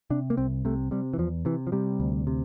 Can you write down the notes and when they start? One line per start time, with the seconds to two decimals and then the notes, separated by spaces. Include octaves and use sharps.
0.10 C3 D4
0.30 A#3
0.37 C2 C4
0.65 C3 A3
0.91 C3 G3
1.14 E3
1.18 E2 F3
1.45 C3 E3
1.67 F3
1.72 C3 G3
2.00 D2
2.27 C3